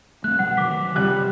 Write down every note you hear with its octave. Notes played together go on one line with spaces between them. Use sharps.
A3 C4 F#6
B2 F#3 G3 F#5
D#3 F#3 D6 B6
C3 G3 F#6